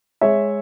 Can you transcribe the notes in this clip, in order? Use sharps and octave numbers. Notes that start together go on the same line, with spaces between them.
G#3 C#5 E5